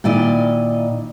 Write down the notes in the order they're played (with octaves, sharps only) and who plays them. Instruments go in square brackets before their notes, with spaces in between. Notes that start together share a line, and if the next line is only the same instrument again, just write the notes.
[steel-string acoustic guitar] A#2 D#3 E4 D5 D#5